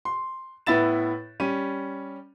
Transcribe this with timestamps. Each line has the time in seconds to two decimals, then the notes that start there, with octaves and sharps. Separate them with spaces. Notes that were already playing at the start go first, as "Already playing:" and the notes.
0.05 C6
0.66 A2 B3 E4 E5 A6 E7
1.40 G3 C#4 D#7